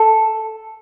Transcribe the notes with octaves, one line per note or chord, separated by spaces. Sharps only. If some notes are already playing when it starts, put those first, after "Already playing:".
Already playing: A4